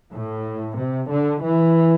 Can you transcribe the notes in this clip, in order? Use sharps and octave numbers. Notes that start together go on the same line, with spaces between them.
A2
C3
D3
E3